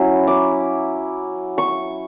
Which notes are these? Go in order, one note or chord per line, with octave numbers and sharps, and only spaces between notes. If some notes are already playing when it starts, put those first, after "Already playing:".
Already playing: F#3 C#4 E4
D6
C#6